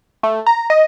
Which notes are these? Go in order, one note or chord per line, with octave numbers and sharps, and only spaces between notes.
A3
A#5
D#5